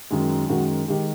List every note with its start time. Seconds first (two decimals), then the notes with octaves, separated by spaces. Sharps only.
0.11 F#2 D#3 G#3
0.49 F#2 D#3 G#3 F#4
0.88 D#3 G#3 G4